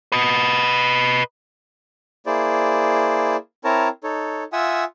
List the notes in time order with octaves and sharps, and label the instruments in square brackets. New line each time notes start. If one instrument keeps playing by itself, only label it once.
[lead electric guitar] B4 D#5
[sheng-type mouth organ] A#3 E4 G#4 C5 D5
C4 E4 A#4 C#5 A5 A#5
D#4 A4 C#5
F4 E5 F#5 G#5 D#6 E6